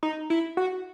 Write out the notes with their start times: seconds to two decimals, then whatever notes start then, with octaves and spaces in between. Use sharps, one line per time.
0.03 D#4
0.30 E4
0.57 F#4